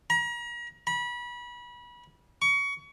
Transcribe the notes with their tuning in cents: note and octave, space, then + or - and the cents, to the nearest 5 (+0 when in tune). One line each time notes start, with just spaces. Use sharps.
A#5 +40
B5 -30
C#6 +25